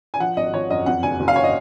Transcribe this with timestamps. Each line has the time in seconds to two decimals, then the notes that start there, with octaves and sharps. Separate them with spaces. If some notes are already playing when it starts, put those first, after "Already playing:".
0.14 G#5
0.20 F3 F#5
0.37 G#1 D#5
0.54 F3 C#5
0.70 F#2 D#5
0.86 F2 F#5
1.03 F#1 G#5
1.20 F#1
1.28 F5
1.36 C#5
1.44 D#5